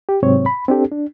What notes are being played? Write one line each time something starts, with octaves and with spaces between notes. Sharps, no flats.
G4
G#2 C3 F#3 C4 C#5
B5
C4 D4 G4 A4
D4